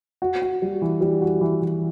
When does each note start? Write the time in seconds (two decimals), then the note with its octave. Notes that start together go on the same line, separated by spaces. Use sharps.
0.22 F#4
0.42 F#4
0.62 G3
0.82 E3
1.01 G3
1.22 F#4
1.41 E3
1.62 E3